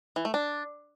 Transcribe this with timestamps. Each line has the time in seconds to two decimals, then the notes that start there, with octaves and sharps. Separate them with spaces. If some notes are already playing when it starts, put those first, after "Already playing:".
0.16 E3
0.25 A3
0.34 D4